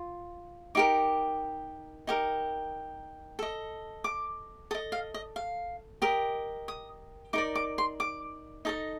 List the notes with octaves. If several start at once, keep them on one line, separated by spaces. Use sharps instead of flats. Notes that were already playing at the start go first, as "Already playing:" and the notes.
Already playing: F4
D#4 G4 A#4 D6
D#4 G4 A#4
A4 D#5
D6
A4 D#5 D#6
F5
D#5
F5
G4 A#4 D#5
D#6
D#4 A#4 D5 D6
D6
C6
D6
D#4 A4 D#5 D#6